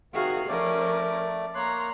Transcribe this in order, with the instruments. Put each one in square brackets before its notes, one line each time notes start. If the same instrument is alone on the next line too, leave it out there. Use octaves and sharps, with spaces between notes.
[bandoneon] C3 D#3 [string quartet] F#4 G#4 F5
[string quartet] F3 C#4 A#4 [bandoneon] A3 D5
[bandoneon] A#3 C#5 F#6 [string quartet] A#5 C6